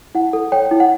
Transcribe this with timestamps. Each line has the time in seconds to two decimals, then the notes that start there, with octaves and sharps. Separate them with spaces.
0.15 E4 F#5
0.33 A4
0.52 C#5 G5
0.71 E4
0.80 F#5